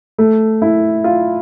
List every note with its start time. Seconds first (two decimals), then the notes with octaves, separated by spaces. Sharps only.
0.18 A3
0.62 E4
1.04 F4